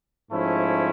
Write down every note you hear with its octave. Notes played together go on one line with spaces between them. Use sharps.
G#2 F3 A3 C#4 E4